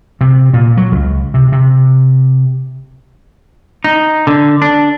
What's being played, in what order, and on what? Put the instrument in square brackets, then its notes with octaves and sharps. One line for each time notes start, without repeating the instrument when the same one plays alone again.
[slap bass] C3
A#2
F#3
C#2
C3
C3
[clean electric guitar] D#4
D3
D4